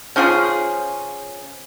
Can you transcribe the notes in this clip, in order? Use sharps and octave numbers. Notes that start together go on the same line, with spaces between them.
C#3 F3 F4 G#4